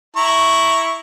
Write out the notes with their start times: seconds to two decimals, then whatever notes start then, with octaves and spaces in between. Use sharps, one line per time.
0.16 E4 A#5 C#6